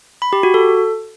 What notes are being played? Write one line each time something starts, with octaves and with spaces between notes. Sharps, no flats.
B5
G4
F#4
A4